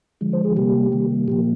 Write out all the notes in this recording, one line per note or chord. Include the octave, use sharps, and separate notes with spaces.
D3 F3 G#3
C5
G#4
C3 G3 A#3 G4
C3 D#3 G3 A#3
A#2 F3 A#3 G4